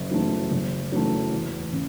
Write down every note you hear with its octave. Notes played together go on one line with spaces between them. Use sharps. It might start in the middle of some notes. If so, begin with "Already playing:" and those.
Already playing: F#1
F#2 E3 A3
F#1
F#2 E3 A3
E2
C#3